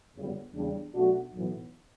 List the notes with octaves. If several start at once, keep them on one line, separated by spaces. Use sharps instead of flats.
G1 F#2 C#3 G3 B3
E2 C#3 G3 D4
B1 B2 A3 D4 F#4
B1 A2 E3 B3